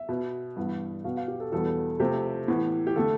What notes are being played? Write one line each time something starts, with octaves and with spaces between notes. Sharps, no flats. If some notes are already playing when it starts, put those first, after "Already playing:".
Already playing: E5
B2 B3
G2 E3 B3
B2 B3 F5
F5
G4
A4
E2 B2 G3 B3 A4
C3 F3 A3 G4
A2 E3 B3
G4
D3 A3 A4